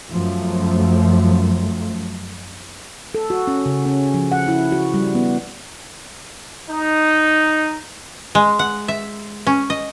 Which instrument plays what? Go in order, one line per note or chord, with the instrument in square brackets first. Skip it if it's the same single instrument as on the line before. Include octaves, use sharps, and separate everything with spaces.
[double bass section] F#2 F3 A3
[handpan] A4
F#4
C#4
C#3
C#4
F3
F#5
E4
F#4
G3
B3
[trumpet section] D#4
[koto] G#3
F#5
E5
C#4
D#5